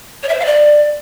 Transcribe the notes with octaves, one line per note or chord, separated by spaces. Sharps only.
C#5
E5
C5
F5
D5